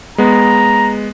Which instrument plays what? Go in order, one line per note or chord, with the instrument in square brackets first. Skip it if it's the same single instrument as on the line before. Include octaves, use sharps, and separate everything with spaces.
[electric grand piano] G#3 B3 [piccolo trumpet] A#5